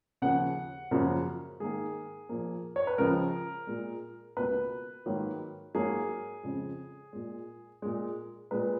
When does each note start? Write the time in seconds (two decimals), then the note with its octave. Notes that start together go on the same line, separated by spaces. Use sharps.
0.22 D#2 C#3 F3 F#5
0.91 F#2 C#3 F3 A#3
1.60 G#2 D#3 A#3 G#4
2.29 A#2 F3 A#3
2.76 C#5
2.87 B4
2.98 C#2 C#3 F3 G#3 A#4
3.67 A#2 G#3
4.37 C#2 B2 A#3 B4
5.06 G#2 D#3 F#3 A#3
5.75 G#2 F#3 A#3 G#4
6.44 F2 C#3 G#3
7.13 A#2 G#3
7.82 A#2 G#3
8.51 A#2 G#3 B4